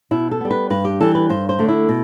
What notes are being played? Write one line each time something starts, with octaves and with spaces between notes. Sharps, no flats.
B2 E4
A4
G3 B3
B4
G2 B4
G4
E3 G3 A4
B4
G2 C5
C5
D3 A3
E4
B2